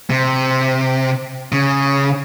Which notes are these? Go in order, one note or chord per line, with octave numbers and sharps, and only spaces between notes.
C3
C#3